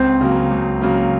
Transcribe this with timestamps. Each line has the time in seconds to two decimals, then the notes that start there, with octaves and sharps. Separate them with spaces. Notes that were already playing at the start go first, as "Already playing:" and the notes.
Already playing: C#2 C4
0.21 C#3 F#3 A#3
0.51 C#2
0.81 C#3 F#3 A#3